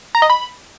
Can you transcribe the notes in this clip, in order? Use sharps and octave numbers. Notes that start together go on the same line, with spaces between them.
A#5
D#5
B5